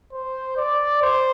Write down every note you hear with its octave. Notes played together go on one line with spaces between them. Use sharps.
C5
D5
C5